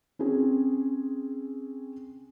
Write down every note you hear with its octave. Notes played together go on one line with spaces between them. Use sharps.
C4 C#4 G#4